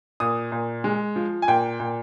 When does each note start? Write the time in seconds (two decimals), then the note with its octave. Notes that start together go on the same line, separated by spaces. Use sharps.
0.20 A#2 D#6
0.52 A#2
0.84 G#3
1.16 F3
1.42 G#5
1.48 A#2 G5
1.80 A#2